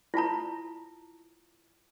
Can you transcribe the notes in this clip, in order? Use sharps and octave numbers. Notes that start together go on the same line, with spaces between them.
E4 F4 A5 A#5